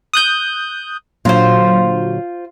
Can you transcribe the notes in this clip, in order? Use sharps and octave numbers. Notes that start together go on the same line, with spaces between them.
D#6 F#6 G6
A#2 D3 F#3 F4 C5